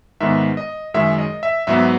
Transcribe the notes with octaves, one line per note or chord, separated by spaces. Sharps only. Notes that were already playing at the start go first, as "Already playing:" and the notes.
G#2 D#3 G#3 B3 E5
D#5
F#2 D#3 G#3 E5
D#5
E5
G#2 F#3 B3 E5